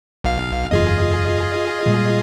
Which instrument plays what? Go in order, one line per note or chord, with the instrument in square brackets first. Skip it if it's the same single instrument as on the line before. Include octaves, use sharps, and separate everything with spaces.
[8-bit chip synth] B1 F5
[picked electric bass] F#1 E2 G#2 [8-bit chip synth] F4 G#4 D#5
[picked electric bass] A#2 G3 G#3